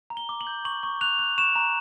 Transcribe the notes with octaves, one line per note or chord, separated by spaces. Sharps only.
A#5
G7
D6
F#7
G6
C#6 F#7
C#6
F#6 F7
F#6
C#6 E7
A#5